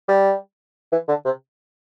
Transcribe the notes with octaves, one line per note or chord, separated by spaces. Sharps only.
G3
E3
D3
C3